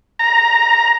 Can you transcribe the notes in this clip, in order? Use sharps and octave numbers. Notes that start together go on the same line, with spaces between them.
A#5